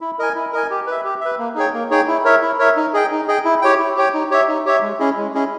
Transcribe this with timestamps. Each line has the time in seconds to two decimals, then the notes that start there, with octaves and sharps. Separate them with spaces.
0.01 E4
0.19 A#4 D#5 G#5
0.35 E4
0.53 A#4 D#5 G#5
0.70 G4
0.87 B4 E5
1.05 G4
1.21 B4 E5
1.39 A#3
1.55 D#4 G#4 C#5 G5
1.74 A#3
1.91 D#4 G#4 C#5 G5
2.08 E4
2.25 A#4 C#5 E5
2.42 E4
2.59 A#4 C#5 E5
2.76 D#4
2.94 G#4 D#5 G5
3.11 D#4
3.28 G#4 D#5 G5
3.45 E4
3.62 G4 C#5 G5
3.79 E4
3.96 G4 C#5 G5
4.14 D#4
4.31 G4 C#5 E5
4.48 D#4
4.66 G4 C#5 E5
4.82 G#3
4.99 C#4 E4 G#4 D#5
5.17 G#3
5.34 C#4 E4 G#4 D#5